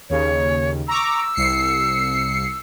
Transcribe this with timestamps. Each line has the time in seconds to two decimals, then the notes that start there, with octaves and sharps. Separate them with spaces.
0.10 D#2 C#3 C#5
0.88 A#5 C#6 D6 E6
1.34 C2 C7 C#7